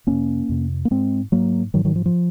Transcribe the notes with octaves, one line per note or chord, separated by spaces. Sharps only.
F2 C3 A#3 C#4
F2 C3
A#3
G#2 G#3 C4
G#2 F#3 A#3
G#2 D#3 F#3
D#3 F#3
F3
F3